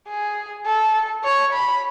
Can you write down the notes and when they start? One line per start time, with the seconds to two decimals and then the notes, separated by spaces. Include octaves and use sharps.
0.09 G#4
0.66 A4
1.24 C#5
1.53 B5